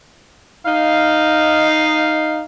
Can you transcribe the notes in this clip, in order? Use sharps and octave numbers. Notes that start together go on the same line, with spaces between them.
D#4 F5